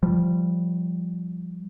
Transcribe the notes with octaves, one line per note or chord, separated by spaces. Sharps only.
F3 G3